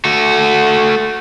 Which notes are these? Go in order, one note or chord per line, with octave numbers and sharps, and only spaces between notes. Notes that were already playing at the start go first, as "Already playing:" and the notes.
A3 F#4